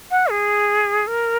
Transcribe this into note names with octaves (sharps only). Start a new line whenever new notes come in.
F#5
G#4
A#4